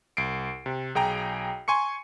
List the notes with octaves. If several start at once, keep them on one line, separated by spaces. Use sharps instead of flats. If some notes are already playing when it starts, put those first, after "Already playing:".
C2 C7 D7
C3
B1 G#4 G5 A#5
G#5 C6 C#6 C#7